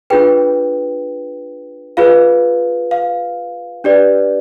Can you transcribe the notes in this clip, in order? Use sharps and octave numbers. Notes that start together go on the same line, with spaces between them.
D4 F4 G#4 B4 G5
F4 G#4 B4 F5
F5
D4 G4 B4 D5